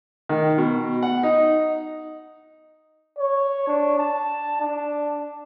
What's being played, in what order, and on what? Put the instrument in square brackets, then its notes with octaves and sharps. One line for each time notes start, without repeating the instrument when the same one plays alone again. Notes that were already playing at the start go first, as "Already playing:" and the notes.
[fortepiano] D#3
B2
F#5
D#4
[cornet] C#5
D4
A5
D4